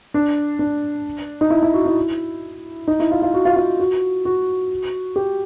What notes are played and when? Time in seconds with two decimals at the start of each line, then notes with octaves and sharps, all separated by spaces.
0.14 D4
0.59 D4
1.41 D#4
1.50 E4
1.63 E4
1.74 F#4
1.86 E4
2.88 D#4
3.00 E4
3.11 F4
3.22 F4
3.34 F#4
3.45 F4
3.56 F4
3.79 F#4
4.25 F#4
5.16 G4